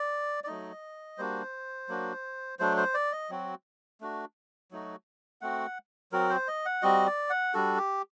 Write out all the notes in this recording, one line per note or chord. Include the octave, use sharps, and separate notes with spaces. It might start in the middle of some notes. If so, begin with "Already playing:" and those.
Already playing: D5
D5
F#3 A3 D#4 D#5
G3 A#3 D4 F#4 C5
F#3 A#3 D4 F#4
F#3 A3 D4 C5
C5
D5
D#5
F#3 C4 F#4
A3 D4 F#4
F#3 A3 D#4 F#4
A3 C4 F#4 F#5
F#3 C4 F#4 A#4
C5
D#5
F#5
G3 C4 F#4 D#5
D5
F#5
G3 D4 F#4 A4
G4